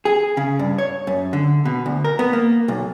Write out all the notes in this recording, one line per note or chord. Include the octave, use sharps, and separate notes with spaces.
G#4
C#3
G2
C#5
F#2
D3
B2
D2
A#4
B3
A#3
B1